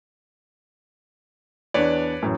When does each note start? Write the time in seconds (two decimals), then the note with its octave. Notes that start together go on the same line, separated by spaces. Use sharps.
1.74 E2 B3 D4 B4 C#5 D5
2.22 F#2 A2 E3